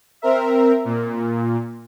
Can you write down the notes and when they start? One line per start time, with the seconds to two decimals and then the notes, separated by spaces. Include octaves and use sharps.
0.22 C4 A#4 E5
0.85 A#2